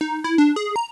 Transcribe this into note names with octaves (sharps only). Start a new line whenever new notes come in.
D#4
E4
D4
G#4
A#5